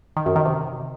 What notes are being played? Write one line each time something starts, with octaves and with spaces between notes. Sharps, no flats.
D#3
F#2
D#3
C3